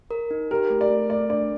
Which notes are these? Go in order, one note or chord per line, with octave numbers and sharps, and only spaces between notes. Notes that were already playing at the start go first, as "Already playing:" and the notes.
A#4
D#4
G4 A#4
A3
D5
A3
A3 D5
D4 D5